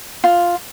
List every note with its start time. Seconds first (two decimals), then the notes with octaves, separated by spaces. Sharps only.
0.24 F4